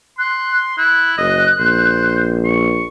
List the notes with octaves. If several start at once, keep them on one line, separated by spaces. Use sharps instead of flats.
C6 F#6
E4 F#6
F#1 D#5
A#1 C5
C#6